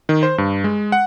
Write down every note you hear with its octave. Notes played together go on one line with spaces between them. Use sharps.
D#3
C5
G2
G#3
F#5